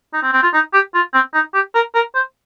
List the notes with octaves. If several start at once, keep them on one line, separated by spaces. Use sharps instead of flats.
D#4
C4
C4
F4
D#4
G4
F4
C4
D#4
G4
A#4
A#4
C5